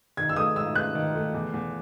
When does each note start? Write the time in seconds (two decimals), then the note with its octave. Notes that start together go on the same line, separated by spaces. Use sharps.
0.17 D#3 G#6
0.29 E6
0.36 A3 D#6
0.56 G#2 E6
0.75 A3 F#6
0.95 D#3
1.15 A3
1.34 E2
1.54 E2